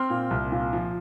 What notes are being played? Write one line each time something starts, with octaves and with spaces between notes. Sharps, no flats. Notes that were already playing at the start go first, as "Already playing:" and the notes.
Already playing: C4 C6 F6
A#2
C2
A#2
F3